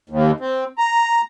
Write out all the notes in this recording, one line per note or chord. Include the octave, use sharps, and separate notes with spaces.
D#2
C4
A#5